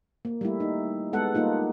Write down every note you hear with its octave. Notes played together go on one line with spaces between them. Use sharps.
A#3
G3 A3 E4
D#4
G#3 B3 A4 F#5
G3 A#3 D#4 F4